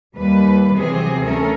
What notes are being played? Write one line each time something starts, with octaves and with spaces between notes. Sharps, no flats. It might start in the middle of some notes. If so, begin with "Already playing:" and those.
D#2 G3 B4
C3 E3 F#3 C4 G#4
D2 A3 C#4 A4 A#4